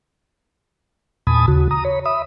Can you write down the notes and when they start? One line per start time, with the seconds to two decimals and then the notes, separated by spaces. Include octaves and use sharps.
1.27 E2 A#2 G#5 A5 B5 D#6
1.48 D#2 C#3 F#4
1.71 A#5 D#6
1.85 C#5 B5
2.05 E5 B5 D#6